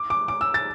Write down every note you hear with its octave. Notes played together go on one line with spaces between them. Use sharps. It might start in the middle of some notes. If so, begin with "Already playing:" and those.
Already playing: D6
D6
D6
E6
A6